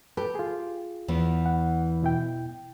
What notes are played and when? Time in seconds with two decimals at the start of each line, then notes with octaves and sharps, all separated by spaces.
0.17 G4 A4 B4
0.35 F4 G#4
1.08 E2 E3 B3
1.46 F#5
2.03 B2 E4 G5